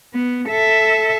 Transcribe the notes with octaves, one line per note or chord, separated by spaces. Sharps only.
B3
A4 E5